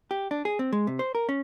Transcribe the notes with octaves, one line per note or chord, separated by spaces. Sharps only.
G4
D4
G#4
C4
G#3
C3
C5
A#4
C#4